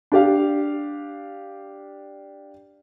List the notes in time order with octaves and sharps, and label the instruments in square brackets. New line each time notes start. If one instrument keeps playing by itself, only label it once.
[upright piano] D4 G4 F5